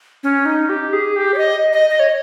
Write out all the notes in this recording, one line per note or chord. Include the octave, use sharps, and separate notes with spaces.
C#4
D#4
G4
G#4
G4
C#5
D#5
D#5
D#5
C#5